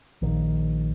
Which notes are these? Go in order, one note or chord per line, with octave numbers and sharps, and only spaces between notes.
A#1 D#3